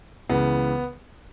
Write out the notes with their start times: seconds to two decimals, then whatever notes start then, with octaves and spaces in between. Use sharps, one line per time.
0.29 C#2 C#3 E3 B3